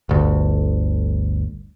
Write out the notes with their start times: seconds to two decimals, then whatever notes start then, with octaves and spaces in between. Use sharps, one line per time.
0.09 G1 D2